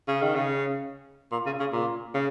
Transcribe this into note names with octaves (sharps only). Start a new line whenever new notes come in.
C#3
D#3
C#3
A#2
C#3
C#3
A#2
C#3